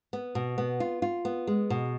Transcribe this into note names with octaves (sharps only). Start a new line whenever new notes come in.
B3
B2
B3
F4
F4
B3
G#3
B2